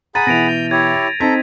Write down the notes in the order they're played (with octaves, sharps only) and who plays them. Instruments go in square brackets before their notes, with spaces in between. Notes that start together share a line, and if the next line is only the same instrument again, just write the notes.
[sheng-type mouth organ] G#4 F#5 B5 [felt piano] A#5 [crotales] A6 D#7
[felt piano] B2 E3 [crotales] A#6 D7 F7
[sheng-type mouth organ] G6
[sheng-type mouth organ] E4 G4 C#5 [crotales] G#6
[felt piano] C4 D#4 [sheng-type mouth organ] A4 A#5 [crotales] B6